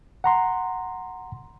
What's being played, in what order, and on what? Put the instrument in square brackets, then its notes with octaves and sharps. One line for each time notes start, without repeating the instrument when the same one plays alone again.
[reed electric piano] F#5 A#5 C6